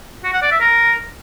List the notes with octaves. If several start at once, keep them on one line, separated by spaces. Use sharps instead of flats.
F#4
F#5
D5
E5
A#4